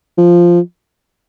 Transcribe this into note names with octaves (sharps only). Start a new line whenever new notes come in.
F3